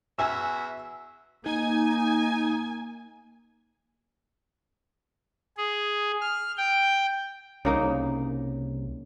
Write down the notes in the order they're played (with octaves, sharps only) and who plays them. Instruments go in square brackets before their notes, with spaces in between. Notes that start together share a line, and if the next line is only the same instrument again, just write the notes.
[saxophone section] E2 F#4 E5 [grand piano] G#5 E6
[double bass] A#3 [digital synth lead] D#4 [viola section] G#5
[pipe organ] G#4
F6
G5
[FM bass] C2 [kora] C#3 A#3 D#4